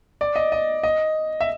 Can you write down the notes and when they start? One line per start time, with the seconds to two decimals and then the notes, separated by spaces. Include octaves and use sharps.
0.21 D5
0.36 D#5
0.52 D#5
0.83 D#5
1.41 E5